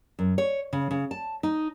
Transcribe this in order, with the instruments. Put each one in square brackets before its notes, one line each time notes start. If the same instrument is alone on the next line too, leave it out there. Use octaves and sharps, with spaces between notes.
[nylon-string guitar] F#2
C#5
C#3
C#3
A5
D#4